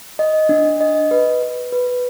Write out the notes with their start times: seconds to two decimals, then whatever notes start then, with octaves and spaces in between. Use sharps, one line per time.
0.19 D#5
0.49 D4
0.81 D#5
1.11 B4
1.42 B4
1.72 B4